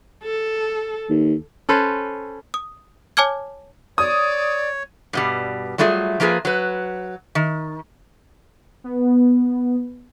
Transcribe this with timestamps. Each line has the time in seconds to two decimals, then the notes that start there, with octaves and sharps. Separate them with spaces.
0.23 A4
1.10 D#2
1.69 C#4 A4 B4 C5
2.54 D#6
3.17 C#5 G#5 A5 D6 F6 G#6
3.98 C#5 D5 D#6
5.13 G2 B2 G3
5.78 F#3 G3 A3 F4 G#4
6.20 F3 A#3 F4 G#4 B4
6.45 F#3 B4
7.35 D#3
8.84 B3